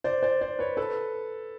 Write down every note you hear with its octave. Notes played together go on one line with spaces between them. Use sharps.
C5 D5
C5 D5
C5 D5
B4 C#5
A4 B4